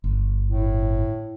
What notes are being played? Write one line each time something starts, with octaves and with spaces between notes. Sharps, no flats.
G1
A2